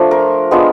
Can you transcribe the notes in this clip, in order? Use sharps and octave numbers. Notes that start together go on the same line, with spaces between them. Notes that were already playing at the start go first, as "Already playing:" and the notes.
Already playing: F3 A3 D4 F4
A#4
G#3 B3 D4 F4